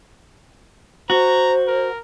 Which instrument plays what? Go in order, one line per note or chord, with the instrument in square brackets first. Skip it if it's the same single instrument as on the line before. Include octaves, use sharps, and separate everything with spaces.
[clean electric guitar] F#4 [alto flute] C5 [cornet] A#5
[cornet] A#4